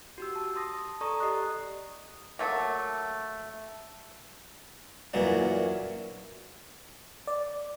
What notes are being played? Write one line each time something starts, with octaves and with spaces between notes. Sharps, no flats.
F#4 G4 E6
A5
A5 C6 D#6 A#6
A4 D5 A#5 C#6 D#6
G4 D#5 D#6 F#6
F#3 A3 A#3
F#2 A#2 E3 F#3 D4
D5